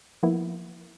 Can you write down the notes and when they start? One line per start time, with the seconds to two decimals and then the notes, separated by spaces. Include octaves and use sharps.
0.23 F3 A#3 B3 E4